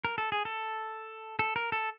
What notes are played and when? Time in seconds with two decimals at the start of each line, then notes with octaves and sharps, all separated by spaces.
0.05 A#4
0.18 A4
0.32 G#4
0.45 A4
1.39 A4
1.56 A#4
1.72 A4